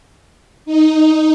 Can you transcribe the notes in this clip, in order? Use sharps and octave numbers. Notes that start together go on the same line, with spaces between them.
D#4